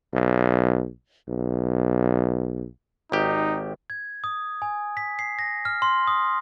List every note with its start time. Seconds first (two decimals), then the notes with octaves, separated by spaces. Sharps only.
0.14 B1
1.28 B1
3.12 G#1 D#4 G4
3.90 G#6
4.24 D#6
4.62 G#5
4.97 B6
5.19 C7
5.39 A#6
5.65 F6
5.82 C6
6.07 D#6